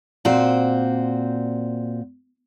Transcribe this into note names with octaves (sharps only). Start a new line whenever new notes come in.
A#2 C4 F#4 C5